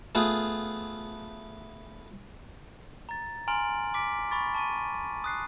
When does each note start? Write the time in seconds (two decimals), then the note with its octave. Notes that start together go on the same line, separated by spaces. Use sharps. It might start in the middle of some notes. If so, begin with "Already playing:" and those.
0.15 A3 B3 F4 G#4
3.09 A#5 A6
3.48 G#5 A#5 C6 F6 D7 F#7
3.94 D6 B6 D7
4.31 B5 C#6 A6
4.54 A5 C#6 D#7
5.24 D#6 F#6 C7